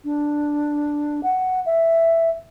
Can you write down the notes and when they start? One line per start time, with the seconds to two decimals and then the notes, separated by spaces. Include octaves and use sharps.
0.05 D4
1.23 F#5
1.66 E5